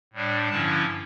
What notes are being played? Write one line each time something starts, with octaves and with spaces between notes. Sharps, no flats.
A2 G3 D4
G2 D3 F3 C#4 E4 A5